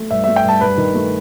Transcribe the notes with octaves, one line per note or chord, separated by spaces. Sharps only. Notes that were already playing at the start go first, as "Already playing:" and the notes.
Already playing: A3
G2 E5
A3 E5
G5
G2 A5
G2 B4
D#3
A3